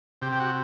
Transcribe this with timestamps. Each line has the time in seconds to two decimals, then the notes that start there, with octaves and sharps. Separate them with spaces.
0.22 C3 G4
0.32 G4
0.39 F#4